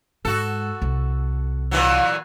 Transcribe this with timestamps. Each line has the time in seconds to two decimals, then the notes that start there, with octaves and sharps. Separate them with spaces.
0.25 G#2 F#4 A4
0.82 C2
1.71 A#2 E3 F#3